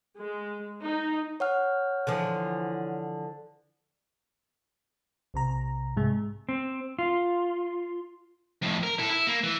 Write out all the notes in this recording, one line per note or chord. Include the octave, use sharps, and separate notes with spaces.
G#3
D#4
C#5 F#5 F6
D3 E3 F3
B1 C3 A#5
G#2 C3 G#3
C4
F4
F2 A2
A#4
E4 A4
E4
A#3
E3